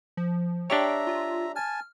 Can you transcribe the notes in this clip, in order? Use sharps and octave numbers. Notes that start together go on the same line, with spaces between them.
F3
D4 G4 C#5 E5 G5 A#5
F4
G#5 A5 F6